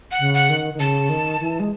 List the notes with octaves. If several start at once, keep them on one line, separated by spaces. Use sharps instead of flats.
F#5
C#3
F#5
D#3
D#3
C#3 A5
D#3
E3
G#3